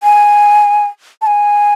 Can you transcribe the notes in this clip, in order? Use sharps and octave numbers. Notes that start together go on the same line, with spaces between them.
G#5
A5
G#5